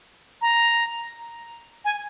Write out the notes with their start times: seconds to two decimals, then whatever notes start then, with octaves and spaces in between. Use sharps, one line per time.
0.42 A#5
1.85 G#5